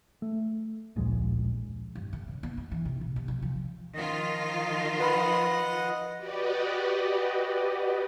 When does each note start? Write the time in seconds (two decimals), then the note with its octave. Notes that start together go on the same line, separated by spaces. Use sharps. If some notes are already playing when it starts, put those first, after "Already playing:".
0.22 A3
0.96 D1 A#1 F2 G#3
1.95 G2
2.13 D3
2.28 C#3
2.43 B3
2.57 G#3
2.71 E3
2.85 C3
3.01 A#1
3.16 C3
3.28 F3
3.42 F3
3.95 D#3 F3 F4 D#5
5.00 B4 D#5 F#5 B5
6.17 F#4 G4 B4 D5 D#5